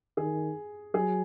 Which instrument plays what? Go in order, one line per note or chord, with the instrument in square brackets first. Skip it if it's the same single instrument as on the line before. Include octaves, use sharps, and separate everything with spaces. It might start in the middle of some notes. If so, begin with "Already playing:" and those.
[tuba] D#3 [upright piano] G#4
[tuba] F#3 [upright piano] G#4